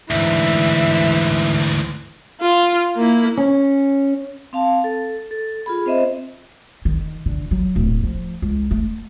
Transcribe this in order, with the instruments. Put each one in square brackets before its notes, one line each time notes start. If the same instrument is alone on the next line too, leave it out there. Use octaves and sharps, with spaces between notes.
[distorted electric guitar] D2 G#2 [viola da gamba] E3 [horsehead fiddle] E5
[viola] F4
A#3 E4
[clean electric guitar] C#4
[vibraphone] C4 F5 A5
A4
A4
F4 G#4 B5
C4 C5 D#5 E5
[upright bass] D#3
D3
F#3
D1
F3
C#2
A3